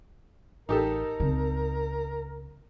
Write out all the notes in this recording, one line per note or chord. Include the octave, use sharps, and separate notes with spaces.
A1 D#4 G4 A4 A#4
C#2 C#3 A3 C4